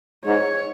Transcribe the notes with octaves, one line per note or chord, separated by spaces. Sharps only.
G#2 C#5